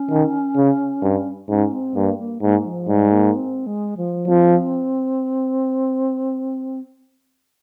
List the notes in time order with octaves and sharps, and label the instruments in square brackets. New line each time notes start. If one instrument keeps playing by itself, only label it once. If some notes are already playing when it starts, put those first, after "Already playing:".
Already playing: [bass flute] C#4
[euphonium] D#3
C#3
G2
[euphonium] G#2 [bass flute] C#4
[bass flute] C4
[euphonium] G2 [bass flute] A#3
[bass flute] A#3
[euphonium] G#2 [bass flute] A#3
[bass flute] F3
[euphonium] G#2 [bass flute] G3
[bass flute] A#3
C4
G#3
F3
[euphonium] F3 [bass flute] C4